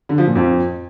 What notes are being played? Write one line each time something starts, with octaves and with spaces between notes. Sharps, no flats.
D3
F3
A#2
F2